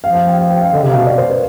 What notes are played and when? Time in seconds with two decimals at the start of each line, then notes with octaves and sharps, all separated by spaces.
0.04 F3 F5
0.15 F5
0.27 G5
0.38 F5
0.50 G5
0.61 F5
0.73 D3 D#5
0.84 C3
0.90 F5
0.96 B2
1.07 D5
1.18 C5
1.30 B4